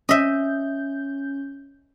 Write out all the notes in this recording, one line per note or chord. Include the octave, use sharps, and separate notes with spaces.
C#4 D#5 E5 G6